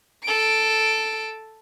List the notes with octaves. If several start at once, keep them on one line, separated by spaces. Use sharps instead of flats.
A4 D7